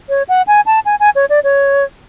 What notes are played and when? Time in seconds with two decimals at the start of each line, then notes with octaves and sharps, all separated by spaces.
0.09 C#5
0.29 F#5
0.47 G#5
0.66 A5
0.85 G#5
1.00 G#5
1.15 C#5
1.30 D5
1.44 C#5